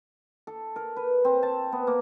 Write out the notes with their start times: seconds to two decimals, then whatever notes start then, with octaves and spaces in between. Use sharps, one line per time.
0.47 A4
0.76 A#4
0.96 B4
1.25 C4
1.43 A5
1.72 B3
1.87 A#3